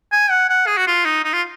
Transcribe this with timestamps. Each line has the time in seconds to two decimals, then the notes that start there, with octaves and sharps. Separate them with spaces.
0.12 G#5
0.30 F#5
0.49 F#5
0.67 G#4
0.77 F#4
0.87 F4
1.05 D#4
1.24 D#4
1.33 F4